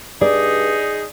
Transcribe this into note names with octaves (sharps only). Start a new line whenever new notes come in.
G2 D#4 G#4 D5